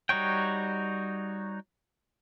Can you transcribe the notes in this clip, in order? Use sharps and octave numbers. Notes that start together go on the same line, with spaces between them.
G3 D#4 F#4 C#5 G5